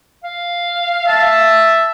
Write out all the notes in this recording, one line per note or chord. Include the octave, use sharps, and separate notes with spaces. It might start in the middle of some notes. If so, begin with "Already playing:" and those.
F5
E5 A5